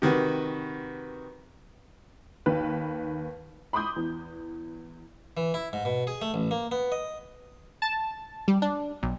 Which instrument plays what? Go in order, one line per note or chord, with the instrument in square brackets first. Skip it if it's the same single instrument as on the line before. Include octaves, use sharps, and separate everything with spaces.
[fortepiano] C3 D#3 F#4 B4
[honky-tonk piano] D#2 D#3 B4
B5 C6 D6 D#6 G6
E2
[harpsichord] E3
E4
G#2
B2
G#4
A3
A1
A#3
B3
D#5
[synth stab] A5
G3
D4
B1